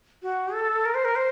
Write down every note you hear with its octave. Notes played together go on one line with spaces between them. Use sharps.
F#4
A4
A#4
C5
A#4
C5